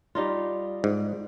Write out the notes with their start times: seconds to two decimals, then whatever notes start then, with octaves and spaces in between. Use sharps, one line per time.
0.15 G3 D#4 F4
0.84 G#2